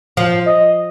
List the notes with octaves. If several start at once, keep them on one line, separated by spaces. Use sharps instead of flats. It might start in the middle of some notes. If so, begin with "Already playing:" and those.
F3
D#5